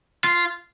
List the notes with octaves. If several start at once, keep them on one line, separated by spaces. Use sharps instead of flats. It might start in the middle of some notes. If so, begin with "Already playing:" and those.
F4